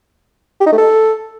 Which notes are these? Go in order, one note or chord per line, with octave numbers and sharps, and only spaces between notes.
G4
D#4
A3
A4